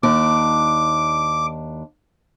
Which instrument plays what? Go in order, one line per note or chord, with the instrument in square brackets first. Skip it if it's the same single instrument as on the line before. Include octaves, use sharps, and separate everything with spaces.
[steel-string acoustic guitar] D#2 D4 [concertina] D6